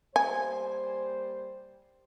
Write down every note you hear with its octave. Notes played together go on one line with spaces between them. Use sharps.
G3 A#3 C5 G#5